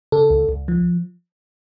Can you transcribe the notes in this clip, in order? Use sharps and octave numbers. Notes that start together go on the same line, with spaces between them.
C#3 A4
C#2
C#2
F3